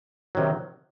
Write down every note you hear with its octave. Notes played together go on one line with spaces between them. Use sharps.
C3 D#3 F#3